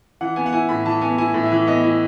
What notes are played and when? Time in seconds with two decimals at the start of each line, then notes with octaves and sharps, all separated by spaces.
0.21 E3 F#5
0.36 B3 G#5
0.46 F#5
0.53 E4 G#5
0.69 A2 B5
0.85 E3 A5
1.01 B3 G#5
1.18 E4 G#5
1.34 A2
1.43 E5
1.52 E3
1.67 B3 D#5
1.83 E4